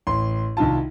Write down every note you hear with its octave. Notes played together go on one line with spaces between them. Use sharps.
A1 C6
C2 D#3 E4 F4 A5